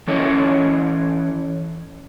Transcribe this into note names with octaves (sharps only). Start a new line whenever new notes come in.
E3 C#4 E4 A4 C#5 D#5